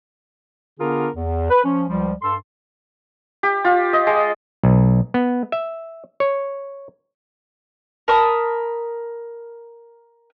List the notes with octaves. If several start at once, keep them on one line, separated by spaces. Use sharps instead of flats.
D3 B3 D4 F4 G#4 A#4
E2
B4
F3 C#4
C#2 F3 G3
G2 A4 C6
G4
F4
D#5
G#3
B1
B3
E5
C#5
A#4 A5 B5 D#6